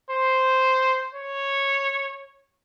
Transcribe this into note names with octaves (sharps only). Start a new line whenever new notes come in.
C5
C#5